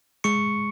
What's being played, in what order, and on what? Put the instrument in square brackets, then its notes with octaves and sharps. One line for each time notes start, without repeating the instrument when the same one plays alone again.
[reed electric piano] G#3 [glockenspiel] C#6 C#7